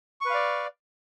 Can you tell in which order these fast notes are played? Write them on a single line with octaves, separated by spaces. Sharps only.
C#6 B4 F5 D5